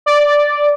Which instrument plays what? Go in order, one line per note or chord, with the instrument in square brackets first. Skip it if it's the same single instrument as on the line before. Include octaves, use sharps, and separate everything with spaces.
[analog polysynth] D5